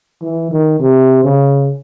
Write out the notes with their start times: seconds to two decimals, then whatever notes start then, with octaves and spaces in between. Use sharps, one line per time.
0.22 E3
0.51 D#3
0.80 C3
1.23 C#3